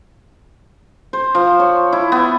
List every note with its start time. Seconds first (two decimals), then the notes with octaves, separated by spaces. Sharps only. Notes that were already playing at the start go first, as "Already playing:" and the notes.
1.13 C5
1.35 F3
1.60 C#5
1.93 E4
2.12 B3